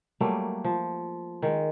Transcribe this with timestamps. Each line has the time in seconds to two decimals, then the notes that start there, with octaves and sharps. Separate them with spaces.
0.20 F#3 G3 A3 A#3
0.64 F3
1.42 D#3 G#3